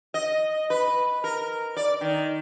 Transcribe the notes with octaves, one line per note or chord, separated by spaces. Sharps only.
D#5
B4
A#4
D5
D#3